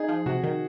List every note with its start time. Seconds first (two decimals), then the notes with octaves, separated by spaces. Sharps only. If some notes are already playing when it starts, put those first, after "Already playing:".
Already playing: D#4 G#4
0.09 F3
0.26 C3 F#4
0.43 D#3